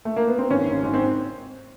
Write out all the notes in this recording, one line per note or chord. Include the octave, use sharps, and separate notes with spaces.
A3
A#3
B3
C4
G#1 C#4
G#1
G#2
C4